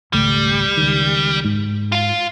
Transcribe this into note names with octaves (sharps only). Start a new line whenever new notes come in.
G#1 C#2 G3 A3
C#2 D#3
G#2
F4 F5